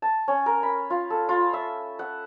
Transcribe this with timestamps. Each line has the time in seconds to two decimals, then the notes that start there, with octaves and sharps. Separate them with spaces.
0.02 A5
0.28 C#4
0.46 A#4
0.63 B5
0.90 F4
1.10 A4
1.29 F4
1.53 E5
1.99 F#5